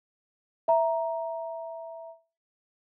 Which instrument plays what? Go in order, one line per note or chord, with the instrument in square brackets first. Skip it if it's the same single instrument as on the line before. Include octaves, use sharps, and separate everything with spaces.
[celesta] E5 A#5